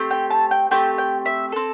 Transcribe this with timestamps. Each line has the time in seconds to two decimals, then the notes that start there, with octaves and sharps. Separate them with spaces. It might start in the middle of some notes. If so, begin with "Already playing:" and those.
Already playing: A3 C4 G4
0.11 G5
0.30 A5
0.51 G5
0.71 A3 C4 G4 G5
0.98 G5
1.26 E5
1.52 C4 A4